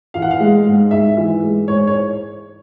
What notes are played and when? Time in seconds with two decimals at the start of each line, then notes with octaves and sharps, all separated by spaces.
0.14 E3 F5
0.22 F#5
0.31 F5
0.40 G#3
0.66 G#2
0.91 G#2 E5
1.17 E3
1.43 G#3
1.68 G#2 C#5
1.87 C#5